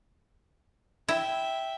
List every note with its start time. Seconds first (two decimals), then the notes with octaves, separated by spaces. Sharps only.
1.08 E4 E5 G5